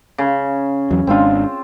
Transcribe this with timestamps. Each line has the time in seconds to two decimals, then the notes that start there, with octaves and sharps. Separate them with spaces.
0.18 C#3
0.91 E2 F#3
1.07 G#1 G#3 C4 D4 F4